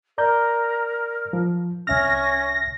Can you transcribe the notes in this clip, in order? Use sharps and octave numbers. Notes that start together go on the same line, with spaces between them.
A#4 D5 A#5 G6
F3
C2 C#4 E5 F6 A#6